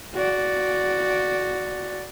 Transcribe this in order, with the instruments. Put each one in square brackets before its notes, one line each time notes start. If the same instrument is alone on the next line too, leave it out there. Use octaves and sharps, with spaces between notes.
[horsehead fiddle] F#4 D5